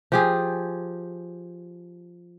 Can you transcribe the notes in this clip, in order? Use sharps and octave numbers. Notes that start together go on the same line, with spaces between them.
F3 G4 G#4